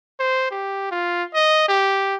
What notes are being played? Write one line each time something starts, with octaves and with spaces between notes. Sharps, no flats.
C5
G4
F4
D#5
G4